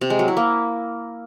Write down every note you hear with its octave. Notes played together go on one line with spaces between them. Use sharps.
C3
G#3
F#3
E4
A#3